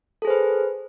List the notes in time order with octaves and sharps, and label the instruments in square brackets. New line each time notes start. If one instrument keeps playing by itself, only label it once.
[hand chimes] A4
G#4
C5
B4